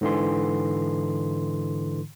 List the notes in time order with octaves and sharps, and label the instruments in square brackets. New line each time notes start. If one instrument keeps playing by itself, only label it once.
[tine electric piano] G#2 D3 E3 C6